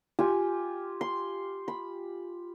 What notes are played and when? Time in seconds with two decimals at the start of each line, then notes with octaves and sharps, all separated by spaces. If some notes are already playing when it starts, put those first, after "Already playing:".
0.19 F4 G4 G#5
1.01 C6
1.68 B5